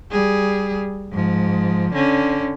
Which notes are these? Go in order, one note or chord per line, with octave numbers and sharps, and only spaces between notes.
G3 G#4
G#2 F3
D3 C#4